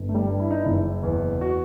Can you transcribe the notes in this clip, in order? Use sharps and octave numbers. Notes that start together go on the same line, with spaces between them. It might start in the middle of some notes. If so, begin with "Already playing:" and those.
Already playing: G1
A3
G3
G2
E4
D#4
E4
F#1
E2
F#4